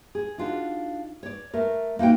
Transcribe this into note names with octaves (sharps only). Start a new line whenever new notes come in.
G#4
D4 D#4 F4 F#4
C#5 D5
A3 A#4
A#3 D#4 F#4 G5